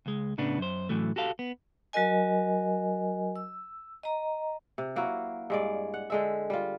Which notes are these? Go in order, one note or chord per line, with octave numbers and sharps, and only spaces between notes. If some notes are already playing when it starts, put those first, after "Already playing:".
C#2 G#3
A2 C#3 B3 D4
F#2 C5
A2 E3 F#3 A3
F#4 G4 A4 F5
B3
F#3 F#4 A#4 D#5 G#5
E6
D#5 A#5
C3
F#3 A#3 E4 F#4
G2 G#3 D5
F#5
D3 G#3 E5
G3 F4